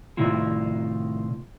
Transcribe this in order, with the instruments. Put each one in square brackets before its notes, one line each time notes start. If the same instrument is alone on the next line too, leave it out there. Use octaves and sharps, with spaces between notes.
[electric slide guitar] A2 C3 D#3 E4 F4